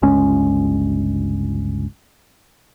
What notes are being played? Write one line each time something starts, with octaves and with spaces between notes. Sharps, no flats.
G1 C#2 G#3 C#4